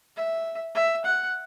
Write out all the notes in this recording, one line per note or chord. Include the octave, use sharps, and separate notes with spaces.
E5
E5
F#5